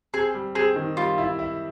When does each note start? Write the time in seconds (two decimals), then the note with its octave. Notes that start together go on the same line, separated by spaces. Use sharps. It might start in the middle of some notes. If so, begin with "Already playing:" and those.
0.14 C4 G#4
0.35 G3
0.55 C4 G#4
0.76 D#3
0.97 G3 F4
1.18 E4
1.39 E4